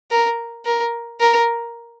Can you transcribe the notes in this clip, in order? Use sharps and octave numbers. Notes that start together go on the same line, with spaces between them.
A#4
A#4
A#4